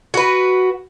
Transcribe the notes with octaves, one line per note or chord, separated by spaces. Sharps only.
F#4 B4